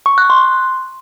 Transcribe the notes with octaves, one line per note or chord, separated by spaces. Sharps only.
C#6
F#6
C6